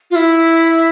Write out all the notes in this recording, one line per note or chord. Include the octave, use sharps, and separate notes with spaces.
F4
E4